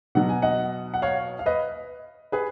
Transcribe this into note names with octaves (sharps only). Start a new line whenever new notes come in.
B2 F#3 F#5
G#5
D#5 F#5
F#5
C#5 F5
F5
B4 D#5
G#4 B4